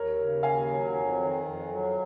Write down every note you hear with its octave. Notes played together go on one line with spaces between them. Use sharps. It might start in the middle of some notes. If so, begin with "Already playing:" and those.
Already playing: D#2 A#4 C#5
C#3
D#2 F5 G#5
F#3
F2
D#3
F2
F#3